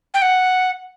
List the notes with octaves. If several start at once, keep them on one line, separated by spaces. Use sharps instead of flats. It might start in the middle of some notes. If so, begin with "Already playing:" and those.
G5
F#5